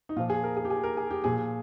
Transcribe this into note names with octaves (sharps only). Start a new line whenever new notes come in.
D#4
A#2 F3 F4
G#4
A#4
G#4
G4
G#4
A#4
G#4
G4
A#2 F3 G#4